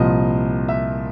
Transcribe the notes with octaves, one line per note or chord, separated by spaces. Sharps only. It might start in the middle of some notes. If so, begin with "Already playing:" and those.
Already playing: C2 A#2 F3 D#5
E5